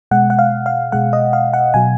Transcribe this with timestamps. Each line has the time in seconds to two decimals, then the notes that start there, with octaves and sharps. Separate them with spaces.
0.11 B2 G#3 F#5
0.30 F#5
0.39 F5
0.66 F5
0.92 B2 G#3 F#5
1.13 D#5
1.33 F5
1.53 F#5
1.74 B2 F#3 G#5